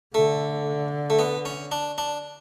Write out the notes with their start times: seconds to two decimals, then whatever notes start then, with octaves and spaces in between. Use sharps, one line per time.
0.15 D3 A3
1.10 A3
1.19 B3
1.45 C#4
1.72 D4
1.98 D4